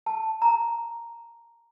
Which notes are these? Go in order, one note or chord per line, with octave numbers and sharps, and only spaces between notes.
A5
A#5